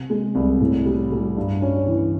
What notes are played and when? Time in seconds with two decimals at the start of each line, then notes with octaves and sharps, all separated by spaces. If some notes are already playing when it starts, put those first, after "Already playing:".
Already playing: C3
0.10 G#3
0.35 C2
0.61 A2
0.86 G3
1.12 G3
1.37 G2
1.62 C#4
1.88 E3